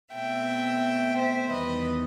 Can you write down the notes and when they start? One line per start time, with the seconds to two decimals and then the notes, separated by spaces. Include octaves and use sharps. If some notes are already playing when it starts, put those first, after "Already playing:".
0.13 B2 A3 C4 E5 G5
1.17 C5 E5
1.51 E2 D#3 G3 B3 B4 D#5